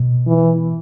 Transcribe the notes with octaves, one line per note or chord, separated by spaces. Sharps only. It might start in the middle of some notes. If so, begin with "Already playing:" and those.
Already playing: B2
E3